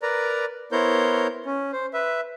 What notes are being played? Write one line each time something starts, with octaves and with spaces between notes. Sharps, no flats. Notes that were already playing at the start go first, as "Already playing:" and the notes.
A#4 B4 D5 A#5
B3 E4 A#4 C5 C#5 G6
C#4
C5
B4 E5